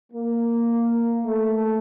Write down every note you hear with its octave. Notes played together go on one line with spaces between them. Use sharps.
A#3
A3